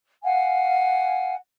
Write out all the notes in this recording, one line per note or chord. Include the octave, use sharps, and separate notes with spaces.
F5 F#5 G#5